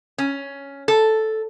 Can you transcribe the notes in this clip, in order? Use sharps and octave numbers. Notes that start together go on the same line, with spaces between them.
C#4
A4